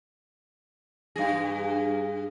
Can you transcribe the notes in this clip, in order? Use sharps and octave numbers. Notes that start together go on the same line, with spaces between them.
G2 G#4 F5 A#6